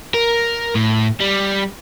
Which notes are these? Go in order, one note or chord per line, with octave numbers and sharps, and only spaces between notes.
A#4
A2
G3